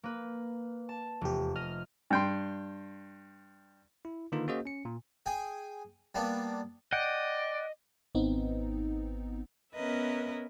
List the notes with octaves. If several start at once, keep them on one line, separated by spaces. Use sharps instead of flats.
A#3 B4
A5
F1 E2 G4
D#5 F6
G2 G5 C6
E4
D3 D#3 A#3 D#4 F4 B4
A#3 C#4 F#4 G#4 C5 D#5
C#4 C#7
A#2
G#4 G5 G#5
G3 A#3 B3 D4
D5 D#5 F#5 G5
G#1 B3 C4 D#4
B3 C#4 A#4 B4 D#5 E5